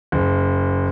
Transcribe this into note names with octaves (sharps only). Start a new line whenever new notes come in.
F#1